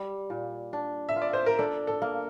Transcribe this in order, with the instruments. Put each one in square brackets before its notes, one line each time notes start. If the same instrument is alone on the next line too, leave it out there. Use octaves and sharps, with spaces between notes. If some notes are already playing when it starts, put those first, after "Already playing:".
Already playing: [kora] G3
A#2
D4
[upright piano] E5
[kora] F4
[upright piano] D5
C5
A#4
[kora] D4 [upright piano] A4
[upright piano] A4
[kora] A#3